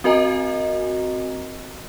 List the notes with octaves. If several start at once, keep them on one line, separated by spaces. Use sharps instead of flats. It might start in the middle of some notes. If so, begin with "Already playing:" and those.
C4 F#4 A#4 D#5 G#5 A#5